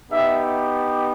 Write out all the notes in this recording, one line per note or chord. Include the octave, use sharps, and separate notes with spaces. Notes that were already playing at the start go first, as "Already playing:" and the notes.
B3 D#4 G4 E5